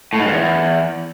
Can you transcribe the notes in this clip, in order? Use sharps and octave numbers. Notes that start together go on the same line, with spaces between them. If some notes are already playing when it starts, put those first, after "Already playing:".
A2
G#2
G2
E2